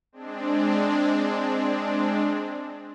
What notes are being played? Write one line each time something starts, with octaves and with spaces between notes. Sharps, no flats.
G#3 C4 D4